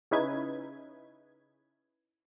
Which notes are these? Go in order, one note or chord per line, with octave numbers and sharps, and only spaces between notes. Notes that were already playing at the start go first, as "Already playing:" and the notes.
C#3 C#4 D#4 E4 B4 G#6